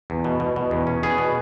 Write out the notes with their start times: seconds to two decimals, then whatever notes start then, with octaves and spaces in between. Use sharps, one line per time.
0.10 E2
0.24 B2
0.40 B2
0.56 B2
0.71 E2
0.87 C#4
1.03 B3 G#4
1.18 B2